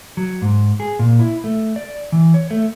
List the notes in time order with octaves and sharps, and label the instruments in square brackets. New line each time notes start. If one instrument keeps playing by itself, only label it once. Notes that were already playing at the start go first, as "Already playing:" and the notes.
[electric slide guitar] F#3
G#2
G#4
A#2
E4
A3
D5
E3
C#5
A3